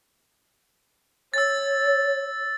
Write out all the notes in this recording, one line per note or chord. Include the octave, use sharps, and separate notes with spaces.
C#5 E6 A6